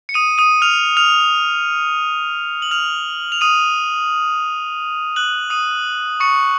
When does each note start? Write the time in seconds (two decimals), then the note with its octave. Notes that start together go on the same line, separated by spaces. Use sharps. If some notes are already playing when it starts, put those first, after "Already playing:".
0.09 C#7
0.14 D#6 D#7
0.38 D#6 D#7
0.62 F6 F7
0.97 F6 F7
2.62 F#7
2.71 F6 F7
3.32 F7
3.41 D#6 D#7
5.16 F#6 F#7
5.50 D#6 D#7
6.20 C#6 C#7